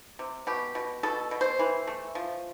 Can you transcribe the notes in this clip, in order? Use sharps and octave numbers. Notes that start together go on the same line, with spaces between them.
C3
B2 G4
B2
B2 A4
B2
C5
E3
A3
F3